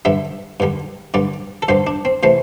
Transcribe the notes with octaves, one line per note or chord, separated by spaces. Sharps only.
G2 D3 G3 E5
G2 D3 G3
G2 D3 G3 D5
A4
G2 D3 G3 C5
D4
C4
C3 E3 A3 C5